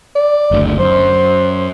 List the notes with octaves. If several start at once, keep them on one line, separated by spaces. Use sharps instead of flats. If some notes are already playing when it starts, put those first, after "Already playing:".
D5
F#1 D2
F#2 C5